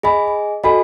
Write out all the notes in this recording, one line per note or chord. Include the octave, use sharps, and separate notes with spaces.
G#4 D#5 G#5 B5
F#4 A4 D#5 G#5 B5